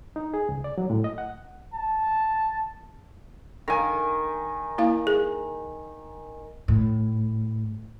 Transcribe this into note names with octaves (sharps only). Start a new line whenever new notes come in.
D#4
G#4
C#2
D5
F#3
A2
D#5
F#5
A5
D#3 G#5
A#3 E4 F5
G#4
A2